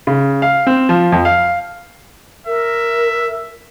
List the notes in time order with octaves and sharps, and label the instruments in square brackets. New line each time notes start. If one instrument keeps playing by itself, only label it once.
[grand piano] C#3
F5
C4
F3
F2
F5
[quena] A#4 [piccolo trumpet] E5